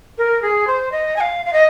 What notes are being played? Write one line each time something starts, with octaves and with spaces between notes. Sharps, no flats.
A#4
G#4
C5
D#5
G#5
F5
F5
D#5